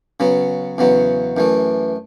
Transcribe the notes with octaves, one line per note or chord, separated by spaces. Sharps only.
C#3 F#3 B3
E2 C#3 F#3 B3
F#2 E3 A3